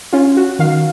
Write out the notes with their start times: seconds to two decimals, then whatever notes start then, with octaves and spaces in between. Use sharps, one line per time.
0.13 C#4 F4
0.37 F#4
0.59 D#3 F5